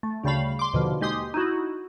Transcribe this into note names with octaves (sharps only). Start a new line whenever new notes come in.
A3
D2 C#3 G3 A3 F5 B5
C6 D6
D#2 B2 D3 F3
D#2 G#3 G4 C6 D#6
D#4 E4 F#4